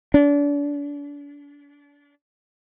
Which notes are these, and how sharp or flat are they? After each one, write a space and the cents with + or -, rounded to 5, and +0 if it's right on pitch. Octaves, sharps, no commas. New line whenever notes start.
D4 -35